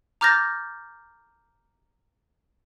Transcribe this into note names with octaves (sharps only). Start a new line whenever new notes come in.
A#5 D6 F6 G6 A6 A#6